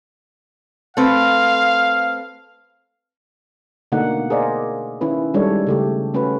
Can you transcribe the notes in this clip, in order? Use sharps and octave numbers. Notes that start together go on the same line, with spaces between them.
A3 C4 B4 F5
B2 D3 A3 A#3 D#4 F#5
G#4 A#4 C5 D5 D#5 F5
D#3 C#4 E4 B4
D#3 G3 G#3 D4 A4 C#5
C#3 A3 G4
A3 C#4 F#4 B4